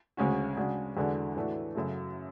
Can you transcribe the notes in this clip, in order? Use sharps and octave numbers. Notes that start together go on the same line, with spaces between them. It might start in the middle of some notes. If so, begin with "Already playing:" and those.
D2 C#3 G#3 C#4 F#4
C#3 G#3 D4 F#4
E2 D3 G#3 D4 F#4
A2 E3 A3 D4 F#4
F#2 C#3 F#3 A3